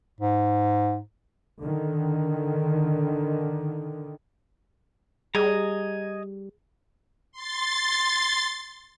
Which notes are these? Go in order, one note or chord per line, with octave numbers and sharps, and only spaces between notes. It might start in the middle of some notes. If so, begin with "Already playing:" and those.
G#2
D3 D#3
G3 G#4 D#5 G#5 A#5
C6 A6